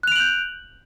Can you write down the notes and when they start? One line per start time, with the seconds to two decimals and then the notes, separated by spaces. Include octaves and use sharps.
0.03 F#6
0.07 F7
0.12 D7
0.16 F#7
0.20 G6